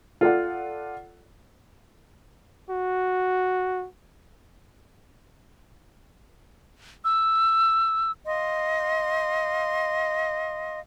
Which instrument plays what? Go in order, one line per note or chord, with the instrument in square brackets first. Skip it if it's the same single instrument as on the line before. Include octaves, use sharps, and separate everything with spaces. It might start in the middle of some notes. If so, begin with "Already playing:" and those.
[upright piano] F4 A4 D5 F#5
[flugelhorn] F#4
[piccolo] E6
[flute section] D#5 F5 C6